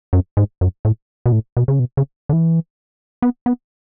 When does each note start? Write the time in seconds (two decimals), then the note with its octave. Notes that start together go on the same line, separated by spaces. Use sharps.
0.13 F#2
0.37 G#2
0.61 F#2
0.85 A2
1.26 B2
1.32 A2
1.57 B2
1.68 C#3
1.80 B2
1.97 C#3
2.29 D3
2.33 E3
3.22 B3
3.46 B3